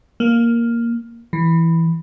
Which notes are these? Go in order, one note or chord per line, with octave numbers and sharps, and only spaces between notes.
A#3
E3